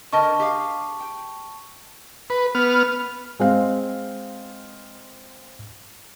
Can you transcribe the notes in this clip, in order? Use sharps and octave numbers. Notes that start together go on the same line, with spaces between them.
D3 A#4 D#5 A5 C#6
G4 G#4 F5
G5
B4
B3 F6
G#3 C4 F5